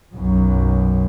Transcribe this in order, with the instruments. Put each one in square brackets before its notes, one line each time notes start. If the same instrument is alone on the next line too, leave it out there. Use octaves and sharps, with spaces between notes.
[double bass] B1 F#2